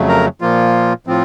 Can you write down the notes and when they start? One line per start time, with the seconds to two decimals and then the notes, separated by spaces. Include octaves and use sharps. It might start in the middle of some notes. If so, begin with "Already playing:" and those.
Already playing: F2 C#3 F#3 A3
0.08 A#4 A#5
0.41 A#2 F3 A#3 F4
1.07 A2 F3 C4 F4